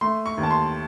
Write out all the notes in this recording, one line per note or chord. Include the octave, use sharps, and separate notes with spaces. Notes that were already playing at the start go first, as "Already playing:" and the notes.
A3 C6
C#6
D#2
A5
C6